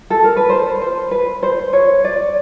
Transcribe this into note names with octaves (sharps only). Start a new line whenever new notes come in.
A4
A#4
B4
C5
C5
B4
C5
C#5
D5